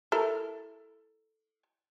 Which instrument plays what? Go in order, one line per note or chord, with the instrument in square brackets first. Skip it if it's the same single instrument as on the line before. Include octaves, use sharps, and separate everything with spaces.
[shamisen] E4 A4 A#4